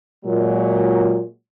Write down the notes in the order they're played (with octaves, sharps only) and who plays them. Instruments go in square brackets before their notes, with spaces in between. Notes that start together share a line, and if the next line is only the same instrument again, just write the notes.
[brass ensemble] A#2 F#3 G#3